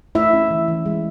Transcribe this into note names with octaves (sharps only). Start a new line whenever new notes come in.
A3 E4 E5
C#4
E3
E3
G#3